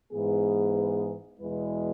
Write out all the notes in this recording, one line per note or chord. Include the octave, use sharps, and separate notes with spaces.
G#2 E3 B3 G#4
E2 B2 G#3 E4 B4